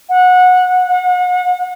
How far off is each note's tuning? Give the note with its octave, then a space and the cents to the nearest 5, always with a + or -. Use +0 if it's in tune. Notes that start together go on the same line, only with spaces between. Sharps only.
F#5 -20
F#5 -40